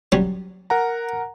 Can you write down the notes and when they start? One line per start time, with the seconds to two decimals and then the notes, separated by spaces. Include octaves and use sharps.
0.12 F#3 G3 C#4
0.70 A#4 F#5 A#5